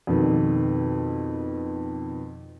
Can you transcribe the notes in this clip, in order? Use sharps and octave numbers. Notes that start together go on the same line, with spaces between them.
F2 B2 D#3